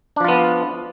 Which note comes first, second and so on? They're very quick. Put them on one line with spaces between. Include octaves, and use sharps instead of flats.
D4 F3 F4 B3